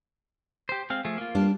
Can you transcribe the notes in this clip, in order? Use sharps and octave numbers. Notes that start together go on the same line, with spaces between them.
G4 C5
G#3 C4 F5
F3 A3 G#4
A#3 F4
G3 D4 D5